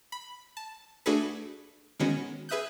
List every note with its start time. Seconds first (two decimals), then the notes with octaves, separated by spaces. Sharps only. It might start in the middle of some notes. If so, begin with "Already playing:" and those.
0.12 B5
0.57 A5
1.06 A3 D4 F#4 G#4 A4 B4
2.00 D#3 G#3 B3 C#4 F#4
2.49 G#4 B4 E5 D#6 F#6 G6